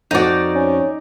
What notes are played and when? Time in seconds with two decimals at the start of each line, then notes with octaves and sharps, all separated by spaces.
0.11 F2 D#4 F#4 D5
0.55 C#4